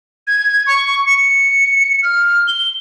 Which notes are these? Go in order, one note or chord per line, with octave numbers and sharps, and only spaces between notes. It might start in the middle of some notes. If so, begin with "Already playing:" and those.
G#6
C#6
C#7
F6
G7